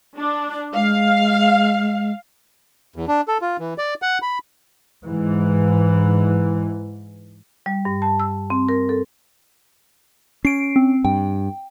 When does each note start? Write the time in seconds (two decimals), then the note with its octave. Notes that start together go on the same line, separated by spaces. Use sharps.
0.18 D4
0.74 G#3 F5
2.96 E2
3.08 D4
3.28 A4
3.41 F4
3.59 E3
3.78 D5
4.02 F#5
4.22 B5
5.06 G#2 E3
7.66 G3
7.85 G2
8.02 A5
8.20 E6
8.50 C4
8.69 A#4
8.89 A4
10.45 C#4 C7 D7
10.76 C4
11.04 G2 G5